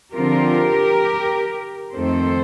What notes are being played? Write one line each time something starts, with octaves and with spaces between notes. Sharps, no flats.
D3 F3 C4 F4 G4 A#4
F2 D#3 A3 C4 A4 C5